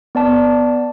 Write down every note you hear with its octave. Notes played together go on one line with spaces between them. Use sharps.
B3 D5 A5